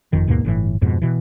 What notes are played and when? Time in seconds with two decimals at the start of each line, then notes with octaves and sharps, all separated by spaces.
0.13 F#1 F2 D#3
0.27 D#2 G#2 B2 A#3
0.44 G1 A2 E3
0.82 F2 G#2 B2
1.02 B2 E3